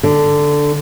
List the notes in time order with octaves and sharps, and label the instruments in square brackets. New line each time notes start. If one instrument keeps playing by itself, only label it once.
[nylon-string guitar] D3